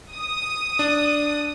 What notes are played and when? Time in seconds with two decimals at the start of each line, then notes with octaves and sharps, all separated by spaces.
0.13 D#6
0.79 D4